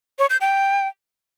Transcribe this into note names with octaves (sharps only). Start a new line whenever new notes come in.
C#5
G6
G5